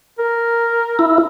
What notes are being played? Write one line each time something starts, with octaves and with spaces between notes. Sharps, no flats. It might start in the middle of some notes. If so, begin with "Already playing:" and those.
A#4
E4